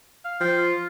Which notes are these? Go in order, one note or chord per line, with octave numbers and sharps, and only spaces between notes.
F5
F3 G5
F4